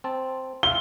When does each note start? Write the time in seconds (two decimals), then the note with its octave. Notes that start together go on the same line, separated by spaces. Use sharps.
0.04 C4 A5
0.63 F4 E5 F5 G7